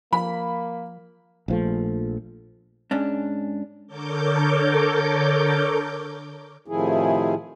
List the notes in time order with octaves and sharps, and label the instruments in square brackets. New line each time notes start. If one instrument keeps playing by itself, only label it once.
[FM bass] F3 [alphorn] A#3 [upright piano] B5
[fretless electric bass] A#1 F3 A3
[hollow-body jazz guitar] G#2 C#4 D4
[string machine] D3 A4 A#4 C#5 D6 G6
[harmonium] A2 C3 D#3 F3 E4 G#4